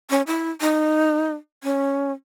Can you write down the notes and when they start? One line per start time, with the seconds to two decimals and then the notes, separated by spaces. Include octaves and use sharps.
0.10 C#4
0.27 E4
0.61 D#4
1.64 C#4